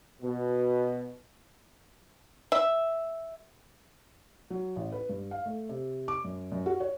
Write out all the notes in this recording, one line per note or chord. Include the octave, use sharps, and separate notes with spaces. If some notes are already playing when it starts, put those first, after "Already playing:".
B2
E5
F#3
A1
B4
G2
F5
A3
C3
D6
F#2
F#2
F#4
C#5